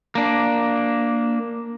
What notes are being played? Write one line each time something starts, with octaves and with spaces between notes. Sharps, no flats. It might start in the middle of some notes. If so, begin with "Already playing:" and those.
A#3 D4